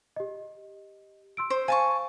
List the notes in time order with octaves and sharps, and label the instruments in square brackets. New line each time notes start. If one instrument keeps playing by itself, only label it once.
[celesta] G4 D#5
C6 E6 D7
[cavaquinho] C5
[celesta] C5 F5 [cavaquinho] G#5 A5 C#6